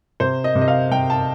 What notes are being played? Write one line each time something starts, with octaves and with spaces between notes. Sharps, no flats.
C3 C5
D#5
C3
D#5
F5
C3 G5
A5